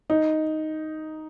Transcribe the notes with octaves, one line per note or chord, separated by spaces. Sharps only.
D#4